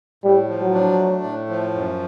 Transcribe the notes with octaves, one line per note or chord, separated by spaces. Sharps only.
A2 G3
F3
F#3
D4
A3
A2
F3
F#2